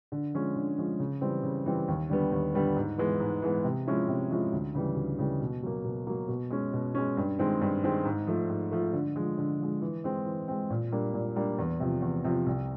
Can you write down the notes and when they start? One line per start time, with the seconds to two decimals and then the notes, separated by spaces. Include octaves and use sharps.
0.12 D3
0.34 F3 G#3 C#4
0.56 D3
0.78 F3 G#3 C#4
1.00 C#3
1.21 E3 G3 C4
1.43 C#3
1.66 E3 G3 C4
1.88 D#2
2.10 D3 G3 B3
2.32 D#2
2.54 D3 G3 B3
2.76 G#2
2.98 E3 G#3 B3
3.20 G#2
3.42 E3 G#3 B3
3.64 C3
3.87 F3 G#3 C#4 E4
4.08 C3
4.31 F3 G#3 C#4 E4
4.53 D2
4.75 C#3 E3 G3
4.96 D2
5.19 C#3 E3 G3
5.41 B2
5.63 F#3 A#3
5.85 B2
6.07 F#3 A#3
6.28 B2
6.50 G#3 C#4
6.73 B2
6.95 G#3 C#4
7.17 G2
7.39 D#3 G#3 C4
7.61 G2
7.84 D#3 G#3 C4
8.05 G#2
8.27 F3 A3
8.49 G#2
8.71 F3 A3
8.93 D3
9.16 F3 G#3
9.38 D3
9.59 F3 G#3
9.82 E3
10.04 G#3 C4
10.26 E3
10.48 G#3 C4
10.70 A#2
10.92 G3 A#3 D4
11.14 A#2
11.36 G3 A#3 D4
11.59 E2
11.80 C3 F3
12.02 E2
12.24 C3 F3
12.46 C2